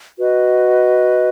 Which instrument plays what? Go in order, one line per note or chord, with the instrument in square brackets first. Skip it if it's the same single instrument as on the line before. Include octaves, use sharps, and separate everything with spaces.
[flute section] F#4 B4 D#5